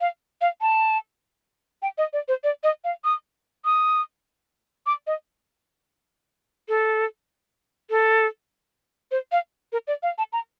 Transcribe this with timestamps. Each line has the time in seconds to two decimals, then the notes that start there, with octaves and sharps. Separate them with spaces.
0.01 F5
0.41 F5
0.61 A5
1.82 G5
1.98 D#5
2.13 D5
2.28 C5
2.44 D5
2.63 D#5
2.84 F5
3.04 D#6
3.65 D#6
4.86 D6
5.07 D#5
6.69 A4
7.90 A4
9.11 C5
9.32 F5
9.72 A#4
9.87 D5
10.03 F5
10.18 A5
10.33 A#5